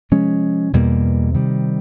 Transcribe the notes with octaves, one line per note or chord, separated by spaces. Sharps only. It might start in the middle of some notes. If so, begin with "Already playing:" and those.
C3 F3 G#3 C#4
E2 B2 G3 A#3
C3 D#3 G3